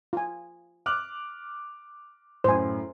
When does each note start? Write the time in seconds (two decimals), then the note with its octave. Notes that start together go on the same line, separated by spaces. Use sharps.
0.13 F4 G#5
0.86 D6 F6 F#6
2.44 F#2 A2 C5 G#5